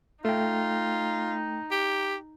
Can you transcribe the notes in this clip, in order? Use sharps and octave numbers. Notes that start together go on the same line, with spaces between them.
A3 D#4 F4 G5
G4